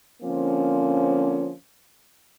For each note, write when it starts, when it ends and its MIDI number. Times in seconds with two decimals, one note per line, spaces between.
0.23 1.51 50
0.23 1.51 53
0.23 1.51 58
0.23 1.51 60
0.23 1.51 61